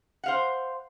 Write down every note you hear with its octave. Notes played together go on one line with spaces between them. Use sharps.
C5 F5 F#5